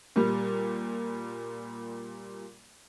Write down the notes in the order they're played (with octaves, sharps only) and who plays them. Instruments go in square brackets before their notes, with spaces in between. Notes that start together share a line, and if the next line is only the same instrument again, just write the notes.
[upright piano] A#2 G3